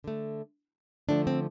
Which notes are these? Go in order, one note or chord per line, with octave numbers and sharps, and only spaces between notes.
D3 A3
D3 F3 A3 D4
C4